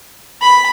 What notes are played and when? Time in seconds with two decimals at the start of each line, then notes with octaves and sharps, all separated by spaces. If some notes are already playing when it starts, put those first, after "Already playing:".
0.41 B5